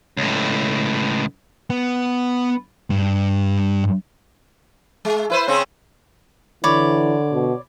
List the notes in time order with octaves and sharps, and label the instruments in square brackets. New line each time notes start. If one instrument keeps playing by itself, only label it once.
[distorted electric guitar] C#2 A2
B3
G2
[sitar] G#3
E4 B4 C5
C#3 C4 C#4
[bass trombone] D3 [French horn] E3 [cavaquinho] C#5 D5 B5
[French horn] B2